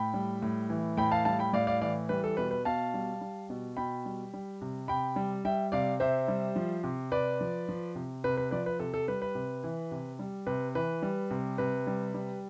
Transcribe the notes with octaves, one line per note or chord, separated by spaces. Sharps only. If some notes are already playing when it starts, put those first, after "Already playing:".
Already playing: A2 G5 B5
G3
A2
E3
A2 G5 B5
F5 A5
G3 F5 A5
G5 B5
A2 D5 F5
D5 F5
E3 D5 F5
G3 B4
A4
B2 B4
B4
B2 F5 A5
G3
G3
B2
B2 G5 B5
G3
G3
C3
C3 G5 B5
G3
G3 E5 G5
C3 D5 F5
C3 C5 E5
G3
F3
C3
C3 B4 D5
F3
F3
C3
C3 B4
B4
F3 B4 D5
B4
C3 A4
A4
G3 B4
B4
C3
E3
C3
G3
C3 B4
E3 B4
G3
C3
C3 B4
G3
G3